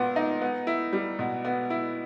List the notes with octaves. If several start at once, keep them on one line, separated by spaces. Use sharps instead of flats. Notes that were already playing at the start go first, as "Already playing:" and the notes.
Already playing: A#2 B3
D#4
B3
E4
G3
B2
B3
E4